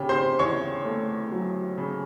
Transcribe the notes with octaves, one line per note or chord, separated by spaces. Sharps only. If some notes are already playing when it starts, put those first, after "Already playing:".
Already playing: C#3 G4
C5 C6
E2 C#5 C#6
A3
F#3
C#3